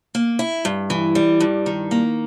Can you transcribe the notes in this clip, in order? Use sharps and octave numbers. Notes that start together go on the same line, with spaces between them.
A#3
E4
G2
E3
G3
G2
D#3
A#3